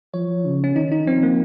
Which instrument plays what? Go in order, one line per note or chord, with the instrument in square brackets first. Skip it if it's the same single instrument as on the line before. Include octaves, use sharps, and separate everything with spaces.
[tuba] F3 [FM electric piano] C#5
[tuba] C#3
[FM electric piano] C#4
[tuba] D#3 [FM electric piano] D#4
[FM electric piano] D#4
[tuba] F3 [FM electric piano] C4
[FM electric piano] A#3